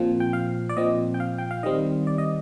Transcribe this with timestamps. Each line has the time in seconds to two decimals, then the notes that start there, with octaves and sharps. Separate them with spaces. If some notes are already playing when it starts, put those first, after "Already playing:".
Already playing: A#2 F3 C4
0.20 G5
0.33 F5
0.69 D5
0.76 A#2 F3 C4 D#5
1.14 G5
1.20 F5
1.38 G5
1.51 F5
1.63 D#3 G3 C4 D#5
2.07 D5
2.18 D#5